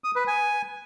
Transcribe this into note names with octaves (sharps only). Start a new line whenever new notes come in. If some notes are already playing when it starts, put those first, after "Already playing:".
D#6
B4
G#5